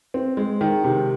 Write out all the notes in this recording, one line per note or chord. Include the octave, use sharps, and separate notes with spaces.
C4
G#3
D#3
C3